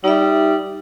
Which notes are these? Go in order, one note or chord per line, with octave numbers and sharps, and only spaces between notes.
G3 D#4 E5